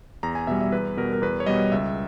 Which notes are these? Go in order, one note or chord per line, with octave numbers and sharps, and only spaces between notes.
E2 A#5
G#5
B2 G3 E5
E5
E2 B4
B2 G3 A#4
A#4
E2 B4
C#5
B2 G3 D#5
C#2 E5